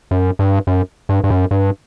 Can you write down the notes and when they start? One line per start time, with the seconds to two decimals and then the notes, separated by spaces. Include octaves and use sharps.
0.11 F#2
0.39 G2
0.67 F#2
1.09 G2
1.24 G2
1.30 F#2
1.51 G2